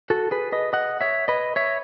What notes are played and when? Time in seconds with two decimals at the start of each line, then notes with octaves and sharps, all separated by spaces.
0.10 F#4 A4
0.31 G#4 B4
0.52 B4 D#5
0.73 D#5 F#5
1.01 C#5 E5
1.28 B4 D#5
1.56 C#5 E5